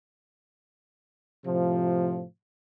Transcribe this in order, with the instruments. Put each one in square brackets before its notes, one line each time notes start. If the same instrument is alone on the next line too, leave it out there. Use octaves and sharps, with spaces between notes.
[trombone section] A2 C3 F3